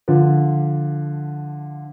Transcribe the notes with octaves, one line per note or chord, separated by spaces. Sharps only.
D3 F3